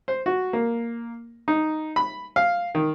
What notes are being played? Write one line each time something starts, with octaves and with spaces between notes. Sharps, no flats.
C5
F#4
A#3
D#4
B5
F5
D#3